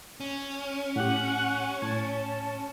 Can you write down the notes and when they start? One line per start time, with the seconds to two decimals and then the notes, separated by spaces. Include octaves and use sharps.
0.20 C#4
0.96 A2 G4 F#5
1.82 A2 A5 C#6 G#6